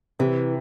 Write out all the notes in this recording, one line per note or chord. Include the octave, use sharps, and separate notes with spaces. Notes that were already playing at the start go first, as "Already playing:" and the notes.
C3 E3